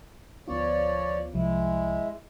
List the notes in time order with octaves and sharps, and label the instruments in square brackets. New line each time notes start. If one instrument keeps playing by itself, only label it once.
[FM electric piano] D2 B3 F4 [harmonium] F3 C#5 D5
[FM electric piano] C2 F3 [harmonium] G#3 E4